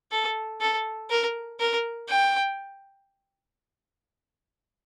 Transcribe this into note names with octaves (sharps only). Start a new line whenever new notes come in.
A4
A4
A#4
A#4
G5